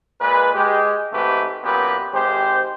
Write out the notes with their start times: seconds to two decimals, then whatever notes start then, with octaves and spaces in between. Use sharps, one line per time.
0.21 A#2 G#3 B4
0.55 G#3 G4
1.12 G#1 G#2 A3 G4 B4
1.63 F#2 A#2 B3 G4 B4
2.13 G#1 G#3 G4 C5